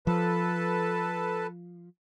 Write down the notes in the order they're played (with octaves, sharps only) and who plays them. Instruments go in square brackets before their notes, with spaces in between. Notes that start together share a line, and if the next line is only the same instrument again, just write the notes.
[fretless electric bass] F3 [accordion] A4 B4 A5